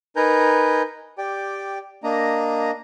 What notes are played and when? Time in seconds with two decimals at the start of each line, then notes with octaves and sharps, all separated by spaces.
0.16 D#4 A#4 B4 G#5 A#5 G6
1.18 G4 D5 G5
2.03 A#3 D4 D#5 A#5